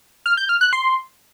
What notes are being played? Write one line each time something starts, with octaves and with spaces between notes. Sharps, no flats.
F6
G6
F6
F#6
C6